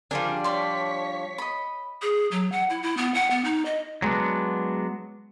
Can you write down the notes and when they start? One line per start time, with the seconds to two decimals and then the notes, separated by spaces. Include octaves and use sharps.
0.11 F3 G3 D4 G#4 A#4
0.44 C#5 D5 C6 C#6 B6
1.38 D#5 B5
2.02 G#4
2.31 F#3
2.52 F#5
2.70 E4
2.82 E4
2.97 B3
3.14 F#5
3.30 B3
3.45 D#4
3.65 D#5
4.02 F#3 G#3 B3 D4